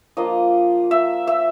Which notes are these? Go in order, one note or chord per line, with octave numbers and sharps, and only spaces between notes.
F3 A#3 D4 F4 D#5
E5
E5